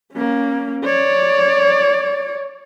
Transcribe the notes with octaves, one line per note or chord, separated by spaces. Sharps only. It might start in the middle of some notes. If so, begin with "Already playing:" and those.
A#3 C#4
C#5 D5